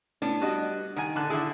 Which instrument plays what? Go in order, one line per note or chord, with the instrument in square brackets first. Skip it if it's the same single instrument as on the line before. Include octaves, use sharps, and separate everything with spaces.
[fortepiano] A2 [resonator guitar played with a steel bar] B3 C#4 D4
[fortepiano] G3 F#4 D#5
[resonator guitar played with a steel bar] D#3 [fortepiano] F#5 G#5
[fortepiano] D3 A5 F#6
[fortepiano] D3 G#4 [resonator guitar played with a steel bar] E4 E5